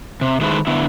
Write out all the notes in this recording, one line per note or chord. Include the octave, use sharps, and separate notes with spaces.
C3
D#3 G#3 A3 E4 B4 C5
D3 B3 E4